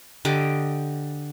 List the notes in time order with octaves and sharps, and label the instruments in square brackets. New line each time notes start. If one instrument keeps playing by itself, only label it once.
[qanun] D3 G4 D#5 D6